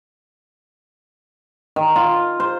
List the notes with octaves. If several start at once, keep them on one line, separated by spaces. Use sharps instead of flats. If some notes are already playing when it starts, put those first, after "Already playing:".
D#3
F4
C5